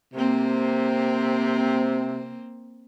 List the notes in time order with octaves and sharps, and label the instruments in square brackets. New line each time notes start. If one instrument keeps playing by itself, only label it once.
[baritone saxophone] C3 [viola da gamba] A#3 C4